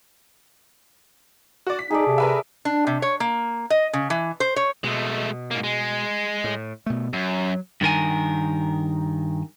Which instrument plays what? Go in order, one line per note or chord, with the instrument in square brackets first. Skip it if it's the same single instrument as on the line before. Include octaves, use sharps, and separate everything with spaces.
[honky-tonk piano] F#4 D5
B6
[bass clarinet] D#4 [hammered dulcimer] G#4 A4 D5
[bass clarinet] C3
[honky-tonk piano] A#4 B4 E5
[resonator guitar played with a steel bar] D4
C3
C#5
A#3
D#5
C#3
E3
C5
C#5
[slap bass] B2 [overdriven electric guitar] G#3 A3
[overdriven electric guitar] G#2 A#3
G#3
[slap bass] A2
B2 A3
[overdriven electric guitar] F#2 [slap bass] F#3
[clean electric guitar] G2 D#3 A#4 G#5